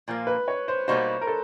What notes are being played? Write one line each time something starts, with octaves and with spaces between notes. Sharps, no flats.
A#2 F3 A#3
B4
C#5
C5
B2 G3 A#3 D#4 F#4 C5
A#4
A4